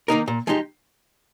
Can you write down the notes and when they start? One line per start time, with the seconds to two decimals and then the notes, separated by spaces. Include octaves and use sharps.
0.08 D#3 A#3 D#4 A#4
0.28 A#2
0.47 F3 G#3 D#4 G4